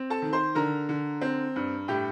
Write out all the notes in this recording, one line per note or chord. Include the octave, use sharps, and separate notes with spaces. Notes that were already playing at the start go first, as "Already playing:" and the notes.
Already playing: C4
A4 A5
D#3
C5 C6
D3 A#4 A#5
D3
C4
G2
A2 G4 G5